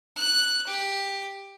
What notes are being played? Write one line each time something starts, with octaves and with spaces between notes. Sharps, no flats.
F#6
G4